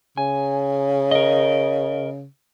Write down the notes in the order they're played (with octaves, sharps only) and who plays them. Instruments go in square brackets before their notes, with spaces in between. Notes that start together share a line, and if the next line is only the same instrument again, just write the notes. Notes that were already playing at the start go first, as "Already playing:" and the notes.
[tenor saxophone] C#3 [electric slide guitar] G#5
[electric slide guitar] A#4 D#5